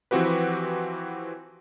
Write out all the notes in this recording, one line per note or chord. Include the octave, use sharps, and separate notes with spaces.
E3 F3 C4 F#4 G4 B4